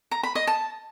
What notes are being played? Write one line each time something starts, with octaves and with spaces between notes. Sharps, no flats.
A#5
B5
D#5
A5